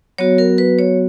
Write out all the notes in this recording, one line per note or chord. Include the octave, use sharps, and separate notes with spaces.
F#3 B3 F#4 C#5
A#4
B4
C#5